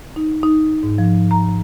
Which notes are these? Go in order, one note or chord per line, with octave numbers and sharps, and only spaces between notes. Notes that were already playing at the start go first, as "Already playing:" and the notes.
D#4
D#4
G#2
F3
A#5